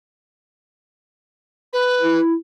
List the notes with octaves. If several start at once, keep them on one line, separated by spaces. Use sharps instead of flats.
B4
E4